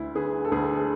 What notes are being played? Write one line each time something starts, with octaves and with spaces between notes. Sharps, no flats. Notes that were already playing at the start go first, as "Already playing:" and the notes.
Already playing: D2 E4
D3 G#4 B4
A4
D2 G#4 B4
G#4